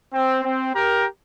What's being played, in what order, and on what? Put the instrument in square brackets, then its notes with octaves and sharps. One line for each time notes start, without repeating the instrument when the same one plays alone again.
[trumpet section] C4
C4
G4 A#4